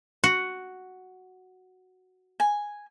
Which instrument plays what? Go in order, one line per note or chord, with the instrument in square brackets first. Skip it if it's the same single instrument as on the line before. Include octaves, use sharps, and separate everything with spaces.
[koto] F#4
[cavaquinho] G#5